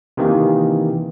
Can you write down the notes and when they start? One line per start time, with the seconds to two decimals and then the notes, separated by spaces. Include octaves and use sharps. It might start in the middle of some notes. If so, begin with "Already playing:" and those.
0.17 C3 D#3 E3 A#3